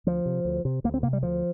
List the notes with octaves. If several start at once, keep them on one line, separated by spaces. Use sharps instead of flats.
D2 F3
C3
D2
C3
D2 A#3
C4
C3 A#3
G3
D2 F3